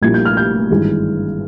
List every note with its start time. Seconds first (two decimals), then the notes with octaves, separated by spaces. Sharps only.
0.02 A#1 A#2 G3 A#3 E4 G#6
0.14 G6
0.25 F6
0.37 G6
0.70 G#1 G2 E3 G#3